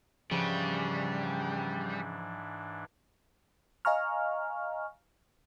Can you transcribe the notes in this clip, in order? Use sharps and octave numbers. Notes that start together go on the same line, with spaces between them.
G#2 C#3 E3 F3 G3 D4
D#5 F5 G#5 A#5 C#6 F6